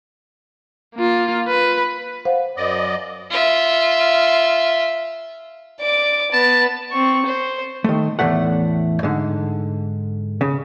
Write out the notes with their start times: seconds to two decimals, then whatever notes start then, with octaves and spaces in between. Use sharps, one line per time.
0.95 A#3 F4
1.48 B4
2.25 C5 F5 F#5
2.57 F#2 D5 D#5
3.30 F4 E5
5.81 D5 D6
6.33 B3 A5
6.92 C4 C#6
7.25 C5
7.84 D#3 A3
8.19 E2 A2 A3 F#5
9.03 G#2 D3
10.41 C#3